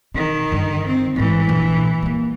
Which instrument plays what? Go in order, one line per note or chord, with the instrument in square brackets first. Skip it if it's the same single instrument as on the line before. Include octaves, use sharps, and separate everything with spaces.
[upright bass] B2 [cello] D#3
[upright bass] G2 D3
[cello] C4
[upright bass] A1 G#2 [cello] E3
[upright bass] A#1
G3 A#3